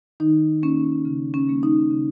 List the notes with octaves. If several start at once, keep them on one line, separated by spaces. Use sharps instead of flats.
D#3 D#4
A#3 C#4
C#3
C#4
G3 A#3
D#4
C#3